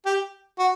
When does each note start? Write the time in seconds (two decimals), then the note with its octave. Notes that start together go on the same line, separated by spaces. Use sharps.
0.05 G4
0.59 F#4